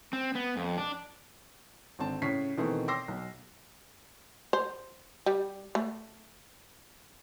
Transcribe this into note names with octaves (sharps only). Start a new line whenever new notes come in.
C4
B3
F2
D4
G#1 D3 C4 A5
A2 C#3 C#5 B6 C7
B2 D#3 E3 A3 C4
G5 C6 D6 E6 A#6 C7
B1
C5
G3
A3